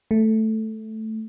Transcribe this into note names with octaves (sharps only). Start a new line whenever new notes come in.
A3